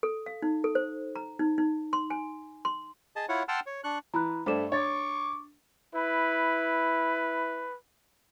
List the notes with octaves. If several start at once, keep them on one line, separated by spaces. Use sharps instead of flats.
A4
F5
D#4
A4
C5
A#5
D#4
D#4
C6
G#5
C6
G#4 D#5 A5
E4 F4 C#5 F#5
F#5 G5 A5 C6 E6 F6
C#5
D4 C#6 F#6
E3 A#5 B5 F#6
G2 A3 C5 D6 E7
D4 C#5 C#6 D6 A6
E4 B4